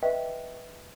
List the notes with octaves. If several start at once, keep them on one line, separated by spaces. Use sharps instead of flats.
B4 D#5 E5 G5